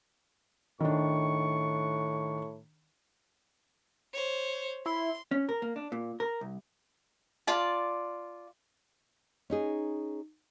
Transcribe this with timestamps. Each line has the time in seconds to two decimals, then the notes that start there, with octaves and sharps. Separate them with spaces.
0.81 A2 D#3 D4 C#6
4.13 C5 C#5
4.86 E4 C6
5.31 C#4
5.49 A#4
5.62 A#3
5.76 D4
5.92 A#2
6.20 A#4
6.41 C2
7.47 F4 D5 A5
9.50 C#4 D#4 G#4